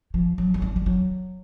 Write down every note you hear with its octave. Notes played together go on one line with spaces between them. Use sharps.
F3
F#3
F#3
G3
G3
F#3